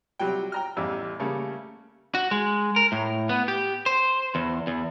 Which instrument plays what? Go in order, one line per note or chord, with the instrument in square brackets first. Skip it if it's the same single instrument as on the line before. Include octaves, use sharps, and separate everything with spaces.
[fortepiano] C3 F#3 G3 G5
G5 A#5 F6
A1 E2 G3 E4 F5 E6
C#3 G3 A3 A#3
[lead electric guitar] F#4
G#3
A#4
A2
B3
G4
C5
E2
E2